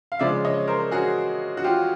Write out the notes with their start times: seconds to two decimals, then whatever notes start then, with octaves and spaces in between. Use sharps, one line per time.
0.12 F5
0.19 C#3 F3 G#3 D5 E5
0.45 C#5 D#5
0.68 A#4 C5
0.91 F#4 G#4
1.57 F#4
1.64 F4 G4